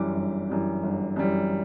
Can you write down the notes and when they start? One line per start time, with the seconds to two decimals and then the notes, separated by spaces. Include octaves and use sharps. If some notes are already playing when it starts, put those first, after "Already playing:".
Already playing: G1 F#2 E3 G3 D6
0.16 G1
0.49 F#2 E3 G3
0.83 G1
1.16 F#2 E3 G3